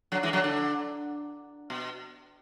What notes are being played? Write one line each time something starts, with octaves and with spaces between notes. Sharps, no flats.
D3 F#3
E3 G#3
D3 F#3
D3
B2